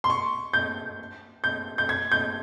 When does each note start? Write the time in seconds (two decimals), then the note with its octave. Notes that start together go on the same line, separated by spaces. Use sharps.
0.04 C6
0.10 C#6
0.53 G6
1.44 G6
1.78 G6
1.89 G#6
2.12 G6